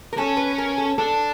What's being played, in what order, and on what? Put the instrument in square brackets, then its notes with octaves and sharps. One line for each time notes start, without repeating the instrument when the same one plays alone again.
[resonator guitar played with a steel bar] A#4
[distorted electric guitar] C#4 [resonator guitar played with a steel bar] A4
[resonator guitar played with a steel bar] B4
A#4
A4
[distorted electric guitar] D4 [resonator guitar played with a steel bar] A4